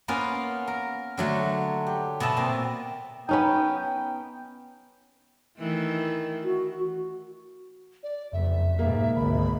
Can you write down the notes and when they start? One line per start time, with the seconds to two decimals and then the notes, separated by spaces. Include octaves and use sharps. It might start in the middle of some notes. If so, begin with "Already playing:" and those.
0.08 A#3 B3 C#4 F4 B4 F5
0.68 A#4
1.17 D3 F#3 A3
1.87 G4
2.20 B2 B3 E5 A5
2.37 A#2 C4
3.29 B3 C#4 D#4 G5
5.57 D#3 E3 A3
6.44 F#4
8.03 D5
8.33 F#1 F2 E5
8.79 F1 G#2 B2 A#3
9.16 G#1 C#2 G#2 D3 B5